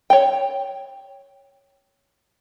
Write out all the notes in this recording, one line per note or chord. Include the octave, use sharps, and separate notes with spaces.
C#5 G5